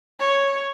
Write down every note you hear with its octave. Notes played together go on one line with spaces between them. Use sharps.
C#5